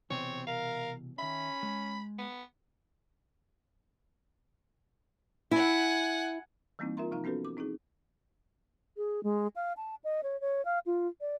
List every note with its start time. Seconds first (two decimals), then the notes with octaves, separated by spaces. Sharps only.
0.10 C2 B2 E3 C4 C#5
0.47 A#4 F5
1.18 D#3 C#4 E5 B5
1.63 G#3
2.18 B3
5.51 E4 F#5 G#5
6.79 E3 G3 A#3 C4 D#4 E4
6.97 F4 A#4 E5 A#5 C6
7.12 C3 F3 D#4 F5 A#5
7.24 B3 C#4 F#4 A4 B4
7.45 D6
7.57 C4 D#4 E4 G#4
8.97 G#4
9.23 G#3
9.56 F5
9.77 A5
10.04 D#5
10.23 C#5
10.41 C#5
10.65 F5
10.86 F4
11.21 D5